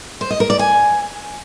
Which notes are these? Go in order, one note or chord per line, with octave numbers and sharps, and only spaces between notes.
C5
D#5
A#4
D5
G#5